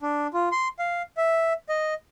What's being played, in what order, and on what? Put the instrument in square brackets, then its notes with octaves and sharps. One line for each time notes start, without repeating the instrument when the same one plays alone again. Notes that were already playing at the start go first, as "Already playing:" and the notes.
[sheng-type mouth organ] D4
F4
C6
F5
E5
D#5